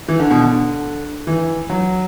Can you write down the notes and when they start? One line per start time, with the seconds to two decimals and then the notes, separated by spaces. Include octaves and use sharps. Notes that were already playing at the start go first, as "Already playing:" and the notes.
0.08 E3
0.19 D3
0.31 B2
0.41 D3
1.27 E3
1.70 F#3